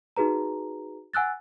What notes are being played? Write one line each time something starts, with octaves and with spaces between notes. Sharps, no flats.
D#4 F#4 G#4 B4 A#5
F#5 G#5 E6 F#6 A6